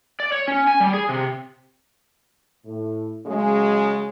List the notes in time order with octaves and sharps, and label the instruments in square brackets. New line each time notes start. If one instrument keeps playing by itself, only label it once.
[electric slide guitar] D5
C#5
C#4
G#5
G3
G#4
C3
[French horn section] A2
C#3 F#3 G#3